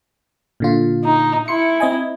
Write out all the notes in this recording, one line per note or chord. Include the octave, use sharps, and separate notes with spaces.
A#2 D3 F4
D#4
E4 C6 C#7
C4 D#5 G#5